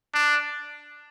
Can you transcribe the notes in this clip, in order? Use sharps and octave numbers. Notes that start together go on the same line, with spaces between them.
D4